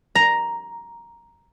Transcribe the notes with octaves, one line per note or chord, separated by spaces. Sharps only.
A#5